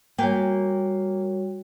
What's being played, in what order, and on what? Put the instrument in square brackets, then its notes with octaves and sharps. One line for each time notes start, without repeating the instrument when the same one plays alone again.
[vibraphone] G3 F#4 C#5 [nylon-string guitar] A#3 G5 G#5